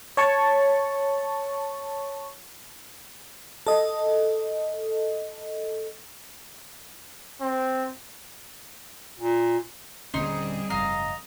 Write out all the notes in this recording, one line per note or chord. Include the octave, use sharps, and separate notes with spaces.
C#5 A5 C#6
A4 D#5
C4
A#2
D#1 D3 G3 C4 C#4 D#4 G#4 C6
F#1 G#2 F3 D#5 F5 A#5